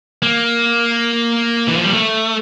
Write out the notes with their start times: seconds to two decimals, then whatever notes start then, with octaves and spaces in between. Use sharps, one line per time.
0.23 A#3
1.68 E3
1.77 F3
1.84 G3
1.93 A3